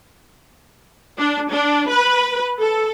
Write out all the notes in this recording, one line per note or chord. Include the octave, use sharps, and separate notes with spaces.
D4
D4
B4
A4